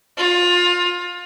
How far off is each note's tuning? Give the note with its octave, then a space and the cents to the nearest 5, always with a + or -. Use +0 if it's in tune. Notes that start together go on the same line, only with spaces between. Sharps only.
F4 +20